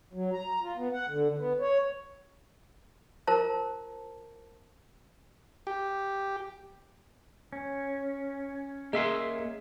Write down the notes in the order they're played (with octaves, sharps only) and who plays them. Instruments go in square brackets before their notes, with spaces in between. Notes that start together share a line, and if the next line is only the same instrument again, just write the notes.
[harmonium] F#3
A#5
F4
B3
F#5
D3
B3
C#5
[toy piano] F4 A#4 C5 A5 A#5
[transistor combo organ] G4
[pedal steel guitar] C#4
[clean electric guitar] A#3 E5 C6 [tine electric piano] G#4 D#5